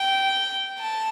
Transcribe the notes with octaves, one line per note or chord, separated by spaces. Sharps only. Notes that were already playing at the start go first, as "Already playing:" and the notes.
Already playing: G5
A5